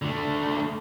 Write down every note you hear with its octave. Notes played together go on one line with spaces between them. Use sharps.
D3 A3